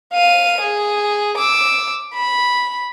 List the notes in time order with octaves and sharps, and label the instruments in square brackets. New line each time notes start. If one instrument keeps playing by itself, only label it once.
[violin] F5 D#7
G#4
D6 E6
B5